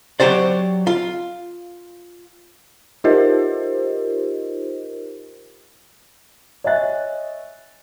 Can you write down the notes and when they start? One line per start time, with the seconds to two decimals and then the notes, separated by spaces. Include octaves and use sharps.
0.20 F#3 B3 F#4 G4 C5 D5
0.87 F4
3.04 D#4 F4 G4 A#4 C5 D#5
6.64 C#5 D#5 E5 G#5 F#6 A6